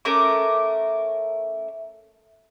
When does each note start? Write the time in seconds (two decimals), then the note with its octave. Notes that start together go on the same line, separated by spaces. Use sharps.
0.05 A3 C#4 A#4 D6